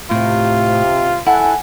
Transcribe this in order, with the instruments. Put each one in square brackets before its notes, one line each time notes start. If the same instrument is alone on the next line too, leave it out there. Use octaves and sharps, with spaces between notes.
[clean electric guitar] A2 [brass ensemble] C3 [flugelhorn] F4
[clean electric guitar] E4 [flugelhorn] A4 [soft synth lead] F#5 [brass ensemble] G#5